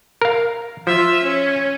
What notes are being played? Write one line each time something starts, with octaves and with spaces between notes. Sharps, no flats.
A#4 F5
F3 F4 E5
C#4